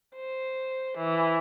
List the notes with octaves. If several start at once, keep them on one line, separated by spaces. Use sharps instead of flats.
C5
E3